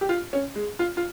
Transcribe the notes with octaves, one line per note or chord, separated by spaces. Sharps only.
G4
F4
C#4
G#3
F4
F4